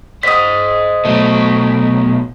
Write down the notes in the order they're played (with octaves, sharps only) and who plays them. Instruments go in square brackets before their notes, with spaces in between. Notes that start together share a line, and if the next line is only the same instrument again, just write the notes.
[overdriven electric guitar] C5 D#5 [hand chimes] D#6 B6
[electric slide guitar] B2 F#3 [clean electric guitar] A3